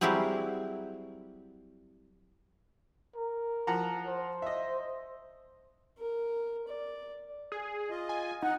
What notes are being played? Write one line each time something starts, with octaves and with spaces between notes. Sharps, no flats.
F#3 G3 C4 E4 G4 G#4
A#4
F3 F#5 A#5
C5
D#5 E5
A#4
D5
G#4
F4 D#5
G#5
D#4 F#5